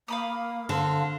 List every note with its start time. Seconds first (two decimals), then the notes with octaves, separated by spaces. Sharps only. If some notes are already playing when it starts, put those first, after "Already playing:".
0.08 A#3 F5 B5 D#6
0.69 D3 C4 F5